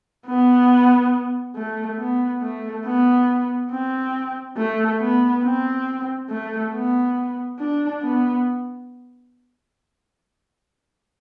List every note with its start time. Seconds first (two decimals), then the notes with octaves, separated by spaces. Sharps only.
0.27 B3
1.55 A3
1.99 B3
2.42 A3
2.85 B3
3.71 C4
4.57 A3
5.01 B3
5.44 C4
6.30 A3
6.74 B3
7.60 D4
8.03 B3